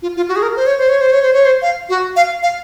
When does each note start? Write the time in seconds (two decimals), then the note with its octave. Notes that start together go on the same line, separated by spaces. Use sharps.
0.02 F4
0.16 F4
0.29 F#4
0.36 G#4
0.42 A#4
0.56 C5
0.66 C#5
0.78 C5
0.89 C#5
1.01 C5
1.12 C#5
1.22 C5
1.33 C#5
1.45 C5
1.62 F5
1.89 F#4
2.16 F5
2.43 F5